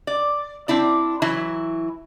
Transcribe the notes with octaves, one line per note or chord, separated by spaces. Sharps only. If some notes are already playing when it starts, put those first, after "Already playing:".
D5
C4 D4 E4 D5
E3 F#3 E4